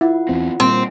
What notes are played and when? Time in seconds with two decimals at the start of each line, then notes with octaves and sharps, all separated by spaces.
0.01 E4 F4 F#5
0.29 E2 C4
0.60 A#2 G3 A#3 C4